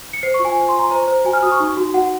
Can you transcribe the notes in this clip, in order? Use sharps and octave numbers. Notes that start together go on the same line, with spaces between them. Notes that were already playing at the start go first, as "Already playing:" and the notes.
C#7
C5 C7
C#6
F4
G#5
C5
C6
F4 A#5
C5 A#5
C5
F#4 G#5
F6
F#4 D#6
C#6
D#4
F#4
F#4 F#5